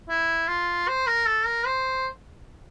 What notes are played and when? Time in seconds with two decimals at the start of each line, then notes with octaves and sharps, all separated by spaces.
0.09 E4
0.48 F4
0.88 C5
1.07 A#4
1.27 A4
1.46 A#4
1.66 C5